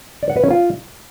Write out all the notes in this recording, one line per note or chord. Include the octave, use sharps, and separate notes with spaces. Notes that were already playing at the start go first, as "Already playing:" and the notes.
D5
F#5
B4
C#4
F4